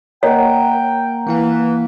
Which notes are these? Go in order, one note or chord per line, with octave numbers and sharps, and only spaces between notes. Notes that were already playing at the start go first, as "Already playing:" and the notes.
A#3 C#5 D#5 F#5 G5
E3 A#3 E4 F5